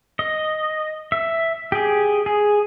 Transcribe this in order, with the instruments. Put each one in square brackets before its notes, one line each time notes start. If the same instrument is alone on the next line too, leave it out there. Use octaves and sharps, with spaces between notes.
[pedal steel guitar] D#5
E5
G4 G#4
G#4